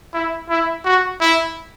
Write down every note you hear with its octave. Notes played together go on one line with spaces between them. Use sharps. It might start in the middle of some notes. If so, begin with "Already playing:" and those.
E4
E4
F#4
E4